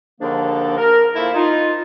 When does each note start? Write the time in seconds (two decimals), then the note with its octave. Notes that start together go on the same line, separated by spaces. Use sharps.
0.20 D#2 G#2 D3 F3 A#3 D4
0.78 A#4
1.16 F3 A3 A#3 E4
1.34 D#4 F4